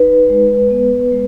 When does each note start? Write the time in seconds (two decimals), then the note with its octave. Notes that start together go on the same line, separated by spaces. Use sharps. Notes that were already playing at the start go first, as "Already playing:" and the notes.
Already playing: D#4 B4
0.30 G#3
0.71 B3
1.12 G#3